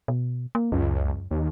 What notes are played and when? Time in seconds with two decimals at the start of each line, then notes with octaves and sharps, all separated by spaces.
0.08 B2
0.55 A#3
0.72 C#2 F#2
1.31 D#2